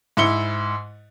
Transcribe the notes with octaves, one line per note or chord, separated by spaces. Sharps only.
G#2 E4 C#7 G7